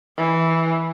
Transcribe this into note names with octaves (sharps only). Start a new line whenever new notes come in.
E3